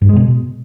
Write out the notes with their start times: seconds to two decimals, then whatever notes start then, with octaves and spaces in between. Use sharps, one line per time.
0.02 G2
0.09 G#3
0.16 B2